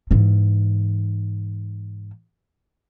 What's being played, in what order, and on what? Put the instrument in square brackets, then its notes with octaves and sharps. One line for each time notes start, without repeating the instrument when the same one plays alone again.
[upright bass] G#2 E3